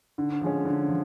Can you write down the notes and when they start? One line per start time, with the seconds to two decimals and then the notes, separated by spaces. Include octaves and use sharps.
0.18 D3
0.41 F3 G#3 C#4
0.65 D3
0.89 F3